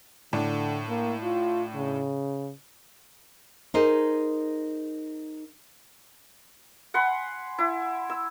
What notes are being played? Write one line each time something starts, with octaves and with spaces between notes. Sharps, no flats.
A2 D3 D4
A#3
F4
C#3
D#4 G#4 A#4 C5 D#5
F#5 G#5 B5 C6
E4
E6